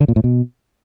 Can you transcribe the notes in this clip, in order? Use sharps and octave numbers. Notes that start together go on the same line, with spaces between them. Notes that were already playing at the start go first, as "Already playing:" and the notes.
D3
A#2
A2
B2